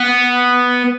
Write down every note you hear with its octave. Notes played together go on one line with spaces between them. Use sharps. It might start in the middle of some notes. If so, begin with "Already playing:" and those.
Already playing: B3